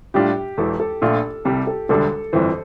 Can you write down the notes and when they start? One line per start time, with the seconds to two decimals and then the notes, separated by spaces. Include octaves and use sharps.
0.14 A2 G3 D4 F4 G4
0.57 E1 E2 E3 A4
0.80 A4
1.01 A#1 A#2 A3 D4 F4
1.45 C2 C3 G3 G4
1.67 A4
1.89 E1 D2 D3 G3 D4 A4
2.33 G1 F2 E3 C5